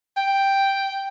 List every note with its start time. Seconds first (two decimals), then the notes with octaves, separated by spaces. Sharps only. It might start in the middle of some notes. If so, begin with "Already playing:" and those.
0.17 G5